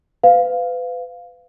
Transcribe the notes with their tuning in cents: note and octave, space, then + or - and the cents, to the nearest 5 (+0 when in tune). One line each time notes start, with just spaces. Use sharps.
B4 +35 F5 +0